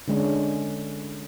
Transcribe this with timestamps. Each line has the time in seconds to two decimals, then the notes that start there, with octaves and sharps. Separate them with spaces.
0.08 D3 G#3 C#4 D4